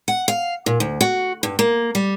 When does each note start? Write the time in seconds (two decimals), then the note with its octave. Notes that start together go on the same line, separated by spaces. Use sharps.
0.08 F#5
0.28 F5
0.66 A#2
0.80 D2
1.01 F#4
1.43 G2
1.59 A#3
1.95 G3